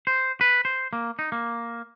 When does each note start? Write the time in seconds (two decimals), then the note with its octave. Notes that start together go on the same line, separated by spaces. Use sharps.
0.07 C5
0.41 B4
0.65 C5
0.93 A#3
1.19 D#4
1.32 A#3